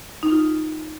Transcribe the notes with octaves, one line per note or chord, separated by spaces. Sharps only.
D#4
F4